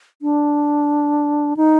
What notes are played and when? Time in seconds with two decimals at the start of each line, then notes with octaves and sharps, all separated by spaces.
0.22 D4
1.57 D#4